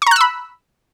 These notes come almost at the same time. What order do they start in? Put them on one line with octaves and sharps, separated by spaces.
C#6 A#5 F#6 E6 B5